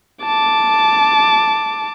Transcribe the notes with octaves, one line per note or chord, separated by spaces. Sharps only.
A5 D6